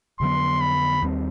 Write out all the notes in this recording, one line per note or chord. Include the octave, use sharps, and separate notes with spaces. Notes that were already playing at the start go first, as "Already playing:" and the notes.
F2 D3 F#3 B3 C6
B5
D#2 D#3 G3 C4